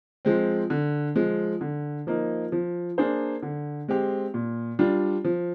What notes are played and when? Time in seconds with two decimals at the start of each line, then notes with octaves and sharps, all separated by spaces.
0.25 F3 G#3 C4
0.70 D3
1.16 F3 G#3
1.61 D3
2.07 F3 A#3 D#4
2.52 F3
2.98 A#3 D4 G#4 C5
3.43 D3
3.89 G#3 C4 G4
4.34 A#2
4.79 G3 D4 F4
5.25 F3